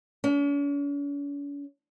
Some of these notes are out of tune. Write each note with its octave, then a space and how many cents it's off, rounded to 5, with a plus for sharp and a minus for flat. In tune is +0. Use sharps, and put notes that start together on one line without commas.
C#4 +45